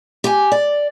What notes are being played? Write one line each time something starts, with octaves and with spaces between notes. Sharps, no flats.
G4 G#5
D5